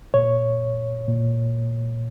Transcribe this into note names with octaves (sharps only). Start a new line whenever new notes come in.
A#2 C#5
A#2